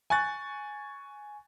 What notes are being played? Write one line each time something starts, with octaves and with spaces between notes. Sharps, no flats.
G#5 C#6 F#6 A6